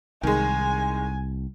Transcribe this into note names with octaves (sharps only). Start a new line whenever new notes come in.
C2 D#3 G#3 G#5